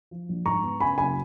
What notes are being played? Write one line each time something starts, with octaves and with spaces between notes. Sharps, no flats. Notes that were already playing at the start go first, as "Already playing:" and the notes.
F3
A#1
G#2 A#5 C#6
B3
C#3 G#5 B5
F#1 G#5 B5